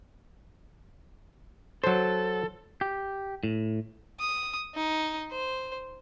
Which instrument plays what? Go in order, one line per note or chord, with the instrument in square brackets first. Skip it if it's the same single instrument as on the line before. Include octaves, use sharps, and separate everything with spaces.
[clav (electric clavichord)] F#3 C5 [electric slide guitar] A4
[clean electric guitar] G4
A2
[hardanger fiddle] D#6
D#4
C5